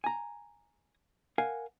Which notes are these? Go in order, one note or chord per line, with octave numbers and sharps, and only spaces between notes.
G#5 A#5
A#4 F5 F#5 G#5